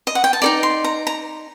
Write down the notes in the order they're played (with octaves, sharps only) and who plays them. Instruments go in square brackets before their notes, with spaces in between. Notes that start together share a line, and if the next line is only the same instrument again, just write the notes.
[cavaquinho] D#5
F#5
G5
A5
D#4 A4 D5 A#5
C6
A#5
A#5